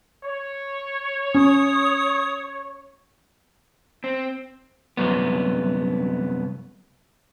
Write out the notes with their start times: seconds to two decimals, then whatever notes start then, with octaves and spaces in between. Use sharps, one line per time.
0.24 C#5
1.35 C#4 D#6
4.04 C4
4.97 C2 F#2 B3